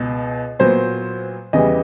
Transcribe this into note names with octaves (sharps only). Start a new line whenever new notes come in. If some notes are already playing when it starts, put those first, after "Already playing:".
Already playing: C#2 B2
A#2 F#3 B3 C5
E2 C#3 E3 G3 D#5